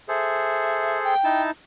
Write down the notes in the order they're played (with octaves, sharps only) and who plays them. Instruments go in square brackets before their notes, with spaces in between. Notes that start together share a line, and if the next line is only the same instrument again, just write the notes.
[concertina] G#4 A4 C5 [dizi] E5
[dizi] G5
[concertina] D#4 E4 A5